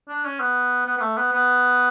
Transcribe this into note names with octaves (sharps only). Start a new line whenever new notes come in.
D4
C#4
B3
B3
B3
A3
B3
B3